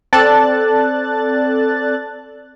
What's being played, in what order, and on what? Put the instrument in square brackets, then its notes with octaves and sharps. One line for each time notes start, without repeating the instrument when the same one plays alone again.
[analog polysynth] C4 A4 D5 A5 F#6 A6